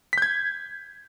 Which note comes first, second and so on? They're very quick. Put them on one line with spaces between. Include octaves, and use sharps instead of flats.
B6 G6 G#6